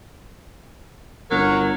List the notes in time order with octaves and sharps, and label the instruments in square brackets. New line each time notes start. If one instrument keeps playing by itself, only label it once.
[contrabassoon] G1 [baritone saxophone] F#3 [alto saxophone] A#4